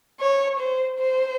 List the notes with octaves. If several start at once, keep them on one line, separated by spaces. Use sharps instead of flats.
C#5
C5
C5